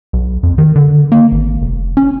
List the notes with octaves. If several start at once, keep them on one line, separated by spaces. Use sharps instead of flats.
B1
F2
D#3
D3
A#3
G#1
F1
C#4